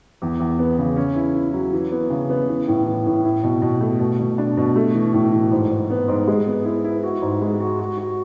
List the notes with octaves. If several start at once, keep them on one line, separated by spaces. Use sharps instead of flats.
E2
E2
B3
C#3
C#4
E4
E4
F#3
E3
B3
C#3
B3
E3
A2
E3
A2
E4
B2
B2
A3
B2
B2
D4
B2
A3
E3
A2
E3
G#2
G#2
B3
G#2
G#3
B3
E4
E4
F#4
G#2
G#3
F#4
F#4
F#4